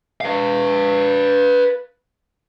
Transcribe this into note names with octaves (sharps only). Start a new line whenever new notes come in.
B4 F5